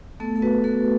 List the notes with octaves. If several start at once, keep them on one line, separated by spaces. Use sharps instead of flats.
A3 B3 A4
A4
B3 F#4 B4
A3 F#4 A4